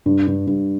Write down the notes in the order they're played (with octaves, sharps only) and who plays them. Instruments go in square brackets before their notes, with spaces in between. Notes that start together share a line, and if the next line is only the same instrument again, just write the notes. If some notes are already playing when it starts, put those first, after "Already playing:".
[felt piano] G2
G2
G2